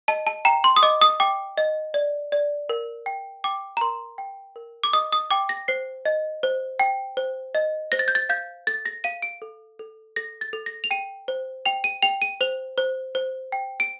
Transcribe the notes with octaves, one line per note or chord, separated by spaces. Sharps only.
D#5 A5
A5
G5 A#5
C6
D#6
D#5 D6
D#6
G5 D6
D#5
D5
D5
A#4
G5
G5 D6
A#5
A#4 C6
G5
A#4
D6
D#5 D#6
D#6
G5 D6
A#6
C5 C7
D#5
C5
G5
C5
D#5
C5 A#6
A6
G6
A6
F5 G6
A4 A6
A#6
F5 D#7
D7
A4
A4
A4 A#6
A6
A4
A#6
F7
G5 D#7
C5
G5 F7
D#7
G5 F7
D#7
C5 F7
C5
C5
G5
D7